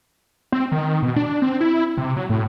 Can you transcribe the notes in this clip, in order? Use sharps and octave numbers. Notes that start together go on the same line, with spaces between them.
C4
D#3
B2
D4
C4
E4
C3
F#3
A2